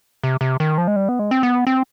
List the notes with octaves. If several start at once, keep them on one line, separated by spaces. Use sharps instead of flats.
C3
C3
D#3
F3
G#3
G3
B3
G#3
C4
B3
C4